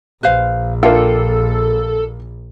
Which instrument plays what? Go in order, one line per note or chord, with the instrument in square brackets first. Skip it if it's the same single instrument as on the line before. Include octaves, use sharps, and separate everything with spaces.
[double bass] A#1 [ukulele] B4 C5 F5
[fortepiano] A#3 D4 F4 [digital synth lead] A4 [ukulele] G5